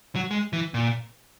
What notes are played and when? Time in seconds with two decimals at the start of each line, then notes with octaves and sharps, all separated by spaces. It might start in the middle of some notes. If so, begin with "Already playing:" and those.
0.16 F#3
0.31 G#3
0.53 E3
0.74 A#2